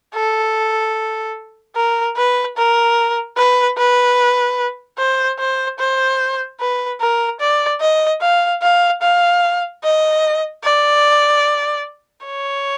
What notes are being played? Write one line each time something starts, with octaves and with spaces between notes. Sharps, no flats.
A4
A#4
B4
A#4
B4
B4
C5
C5
C5
B4
A#4
D5
D#5
F5
F5
F5
D#5
D5
C#5